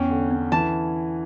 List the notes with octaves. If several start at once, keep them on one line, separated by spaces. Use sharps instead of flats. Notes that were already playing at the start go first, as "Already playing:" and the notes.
Already playing: E2 C#4 G5
D3
C#4
E3 A5